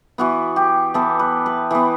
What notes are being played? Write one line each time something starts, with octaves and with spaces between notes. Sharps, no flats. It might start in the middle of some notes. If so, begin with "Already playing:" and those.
E3 B3 F#4
G4
E3 B3 A4
B4
B4
E3 B3